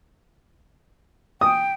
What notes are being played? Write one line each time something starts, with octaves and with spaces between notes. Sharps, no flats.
G5 D#6